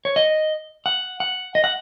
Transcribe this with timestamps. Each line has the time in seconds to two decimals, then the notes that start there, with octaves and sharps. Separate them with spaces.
0.05 C#5
0.16 D#5
0.86 F#5
1.20 F#5
1.55 D#5
1.64 F#5